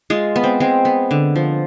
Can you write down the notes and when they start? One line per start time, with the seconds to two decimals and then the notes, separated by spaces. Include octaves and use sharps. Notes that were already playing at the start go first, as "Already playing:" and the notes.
0.10 G#3 F4
0.36 B3
0.44 C4
0.60 G#3 C4
0.85 B3
1.11 D3
1.36 F3